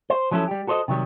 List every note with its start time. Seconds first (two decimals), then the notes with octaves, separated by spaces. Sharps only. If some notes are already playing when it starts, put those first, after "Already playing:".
0.10 C5
0.31 F3 F#3 C#4 E4 A4
0.48 G3 G4
0.67 F#4 A4 C5 C#5 D#5
0.88 C3 D#3 F#3 G3